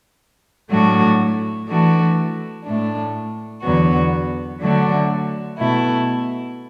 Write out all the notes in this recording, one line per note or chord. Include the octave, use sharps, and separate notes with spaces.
A2 F#3 A3 D4 F#4
E3 A3 D4 F#4
A2 A3 D4
E2 D3 F#3 B3 F#4
D3 F#3 A3 D4 F#4
B2 A3 E4